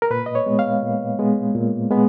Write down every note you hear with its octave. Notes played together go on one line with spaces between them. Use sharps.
A#4
A#2 B4
D#5
C#5
G#3 B3
F5
A#2
G#3 B3
A#2
G#3 B3